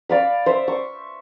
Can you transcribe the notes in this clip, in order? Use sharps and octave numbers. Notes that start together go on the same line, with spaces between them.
D5 F5 B5
C5 E5
C#6